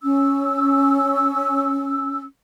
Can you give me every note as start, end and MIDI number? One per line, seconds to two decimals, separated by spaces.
0.03 2.23 61
0.03 2.23 88